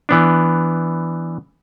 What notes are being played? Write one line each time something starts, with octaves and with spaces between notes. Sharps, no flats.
E3 B3 D4